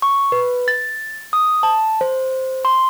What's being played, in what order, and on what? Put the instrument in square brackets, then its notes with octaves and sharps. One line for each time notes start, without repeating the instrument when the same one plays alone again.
[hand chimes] C#6
B4
A6
D#6
A5
C5
C6